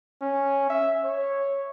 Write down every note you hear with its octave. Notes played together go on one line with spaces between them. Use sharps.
C#4
E5
C#5